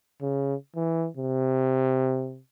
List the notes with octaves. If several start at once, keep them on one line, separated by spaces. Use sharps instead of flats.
C#3
E3
C3